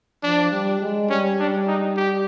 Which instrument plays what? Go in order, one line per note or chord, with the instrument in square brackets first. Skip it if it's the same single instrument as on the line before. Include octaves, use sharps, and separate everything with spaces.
[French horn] F3 [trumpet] D4
[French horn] G3
G#3
[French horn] G3 [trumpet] C#4
[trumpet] D4
D#4
G4